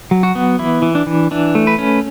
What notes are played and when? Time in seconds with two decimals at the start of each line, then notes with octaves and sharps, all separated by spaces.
0.11 F#3
0.23 F#4
0.35 B3
0.59 E3 E4
0.82 E3
0.95 D4
1.07 E3
1.31 E3 D4
1.55 A3
1.67 B4
1.78 C#4